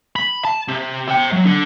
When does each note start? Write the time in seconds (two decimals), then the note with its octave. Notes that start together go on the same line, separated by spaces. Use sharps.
0.16 B5
0.45 A5
0.68 C3
1.08 E5 G5
1.33 F#3
1.45 D3